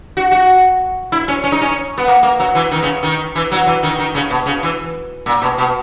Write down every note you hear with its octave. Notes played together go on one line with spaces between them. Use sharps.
F#4
F#4
E4
C#4
C#4
D#4
C#4
B3
A#3
A#3
F#3
E3
D#3
C#3
D#3
E3
F#3
E3
D#3
D#3
C#3
B2
C#3
E3
A#2
B2
B2